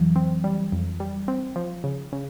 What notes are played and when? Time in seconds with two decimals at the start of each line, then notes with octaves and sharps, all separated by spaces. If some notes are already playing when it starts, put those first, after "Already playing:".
Already playing: F2 E3 F#3
0.16 C4
0.44 G3
0.72 F2
1.00 G3
1.28 C4
1.56 F3
1.84 C#3
2.13 C#3